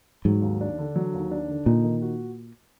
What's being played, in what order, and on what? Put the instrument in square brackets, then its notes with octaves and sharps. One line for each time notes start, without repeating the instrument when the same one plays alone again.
[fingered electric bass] G#2 [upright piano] F#3
[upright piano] D#2
D4
D3
F#3
D#2
D4
D3
[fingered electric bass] A#2 [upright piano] D#4
[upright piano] D#3
F#4